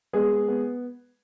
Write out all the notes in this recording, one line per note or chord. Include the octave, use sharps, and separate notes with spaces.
G#3 B3 G#4
B3
B3